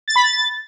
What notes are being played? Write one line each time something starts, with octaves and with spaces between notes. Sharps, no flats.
A6
B5
A6